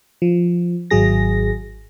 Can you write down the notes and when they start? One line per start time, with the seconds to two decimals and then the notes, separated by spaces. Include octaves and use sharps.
0.22 F3
0.91 G#1 F#3 G#4 A#6